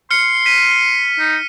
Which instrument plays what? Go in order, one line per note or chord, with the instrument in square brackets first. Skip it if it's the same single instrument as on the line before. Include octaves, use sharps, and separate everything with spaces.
[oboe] C6 [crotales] F6 C#7
[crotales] B6 D#7
[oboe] D#4